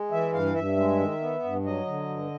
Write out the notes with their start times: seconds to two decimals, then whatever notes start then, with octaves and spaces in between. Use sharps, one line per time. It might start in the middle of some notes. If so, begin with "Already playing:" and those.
Already playing: G#3
0.11 E3 E5
0.33 G2 F5
0.55 G2 E5
0.77 G#3
1.00 D#3
1.21 B3
1.44 G2
1.65 F#3 D#5
1.87 D3
2.09 G2